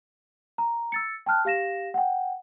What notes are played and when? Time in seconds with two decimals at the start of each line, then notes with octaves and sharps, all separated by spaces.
0.58 A#5
0.92 E6 A6 C#7
1.26 G5 A5 F6 F#6
1.45 G4 F5 A#6 E7
1.94 F#5 G5